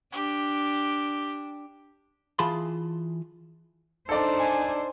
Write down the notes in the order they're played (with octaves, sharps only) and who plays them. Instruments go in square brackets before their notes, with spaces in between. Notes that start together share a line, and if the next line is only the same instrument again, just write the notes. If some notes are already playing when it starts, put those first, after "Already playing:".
[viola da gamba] D4 [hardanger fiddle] G4
[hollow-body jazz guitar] E3 F4 G#4 A5 B5 C6
[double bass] D4 D#4 [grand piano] A4 D5 [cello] C5
[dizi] G#5